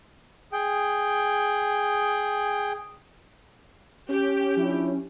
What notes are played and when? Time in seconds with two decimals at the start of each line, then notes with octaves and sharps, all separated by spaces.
0.53 G#4 G5
4.09 C#4 G4
4.57 F3 D4 E4